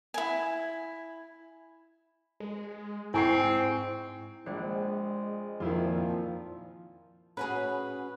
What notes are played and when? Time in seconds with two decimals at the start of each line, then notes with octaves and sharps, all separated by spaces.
0.14 E4 G#5
2.40 G#3
3.14 G#2 C4 E4 G#5 C#6 C7
4.46 A#1 G#3 C5 D5 G5
5.60 F2 A#2 D#3 F3 E4 F4
7.37 C#4 F#4 G#4 B4